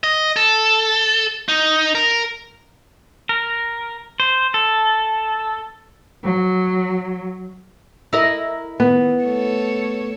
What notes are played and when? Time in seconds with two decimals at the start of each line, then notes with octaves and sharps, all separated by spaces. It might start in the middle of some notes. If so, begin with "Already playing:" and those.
0.04 D#5
0.36 A4
1.49 D#4
1.95 A#4
3.29 A#4
4.20 C5
4.54 A4
6.23 F#3
8.13 E4 A#4 D#5
8.80 D#3 B3
9.24 A3 A4 C#5